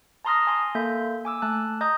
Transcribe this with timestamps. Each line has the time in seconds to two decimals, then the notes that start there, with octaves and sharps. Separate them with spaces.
0.25 A5 A#5 C6 D#6 F6 A#6
0.47 G#5 C6
0.75 A#3 A4 E5 G6
1.25 G#5 D6 E6
1.42 A3 A5 F#6
1.81 D#5 A#5 D#6 G6